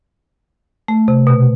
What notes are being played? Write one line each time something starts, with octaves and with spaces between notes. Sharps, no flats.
A3
C3
B2